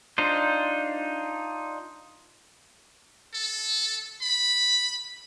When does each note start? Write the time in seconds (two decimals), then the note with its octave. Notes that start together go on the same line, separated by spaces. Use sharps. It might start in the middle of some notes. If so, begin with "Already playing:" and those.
0.18 D4 D#4 F4 C5
3.34 A4
4.22 B5